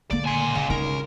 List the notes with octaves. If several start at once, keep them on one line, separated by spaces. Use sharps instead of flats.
D3 A#3 D5
C#2 A#2 G#5 C6
C#3 D5 F5
D#4 A#4